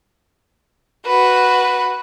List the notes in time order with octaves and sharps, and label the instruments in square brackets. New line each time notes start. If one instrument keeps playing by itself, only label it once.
[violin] F#4 B4